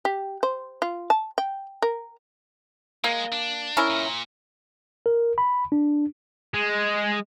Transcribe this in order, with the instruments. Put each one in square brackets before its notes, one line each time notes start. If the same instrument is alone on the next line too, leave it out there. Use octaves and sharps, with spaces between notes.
[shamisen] G4
C5
F4
A5
G5
A#4
[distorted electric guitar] G#3 [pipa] A#3
[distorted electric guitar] D4
[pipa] C#4 E4 A#4
[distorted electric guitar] A#2
[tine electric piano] A#4
B5
D4
[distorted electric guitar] G#3